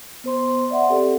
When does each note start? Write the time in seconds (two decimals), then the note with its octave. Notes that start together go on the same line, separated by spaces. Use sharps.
0.24 B3 C5 C6
0.70 D5 E5 F#5 C6
0.89 C4 G4 A4 D5